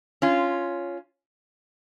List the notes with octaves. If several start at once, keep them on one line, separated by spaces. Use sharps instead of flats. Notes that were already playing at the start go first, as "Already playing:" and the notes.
C#4 F4